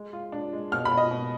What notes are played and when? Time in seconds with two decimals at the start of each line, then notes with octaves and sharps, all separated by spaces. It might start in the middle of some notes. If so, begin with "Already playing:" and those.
Already playing: G#3
0.13 F4
0.32 D4
0.53 G#3
0.72 B2 F6
0.85 B5
0.91 B2
0.97 D#5
1.11 B2